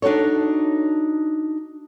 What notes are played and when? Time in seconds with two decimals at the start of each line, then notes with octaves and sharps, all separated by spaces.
0.02 D4 D#4 F#4 A4 C#5